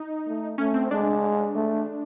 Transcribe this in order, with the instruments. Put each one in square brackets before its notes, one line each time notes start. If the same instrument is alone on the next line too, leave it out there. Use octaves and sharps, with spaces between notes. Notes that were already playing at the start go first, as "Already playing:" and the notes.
Already playing: [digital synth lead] D#4
[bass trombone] A3
[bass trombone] A3 [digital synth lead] C#4
[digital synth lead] C4
[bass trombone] G#3 [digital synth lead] D4
[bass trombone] A3